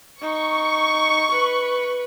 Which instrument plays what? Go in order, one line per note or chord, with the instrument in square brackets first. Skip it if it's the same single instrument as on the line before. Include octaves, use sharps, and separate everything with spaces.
[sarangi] D#4 [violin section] C#6
[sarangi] B4